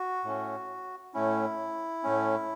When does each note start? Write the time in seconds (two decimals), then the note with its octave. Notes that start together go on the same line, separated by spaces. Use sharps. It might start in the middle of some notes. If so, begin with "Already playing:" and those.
Already playing: F#4
0.25 A2 A3 C#4
1.14 A2 A3 C#4 E4
2.03 A2 A3 C#4